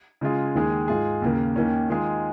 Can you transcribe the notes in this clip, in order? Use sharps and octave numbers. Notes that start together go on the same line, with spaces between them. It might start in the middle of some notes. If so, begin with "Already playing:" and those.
C#3 G#3 F4 G#4
D#2 D#3 G#3 D#4 G#4
G#2 G#3 F4 G#4
D#2 C#3 A#3
D#2 D#3 A#3 C#4
D#3 G#3 F4 G#4